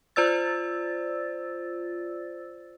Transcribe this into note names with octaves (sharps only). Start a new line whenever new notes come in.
F4 C5 D5 E6 A6